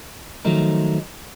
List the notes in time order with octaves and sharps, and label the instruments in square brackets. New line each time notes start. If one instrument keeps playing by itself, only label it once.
[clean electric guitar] D#3 F3 F#3 A3 D#4 A#4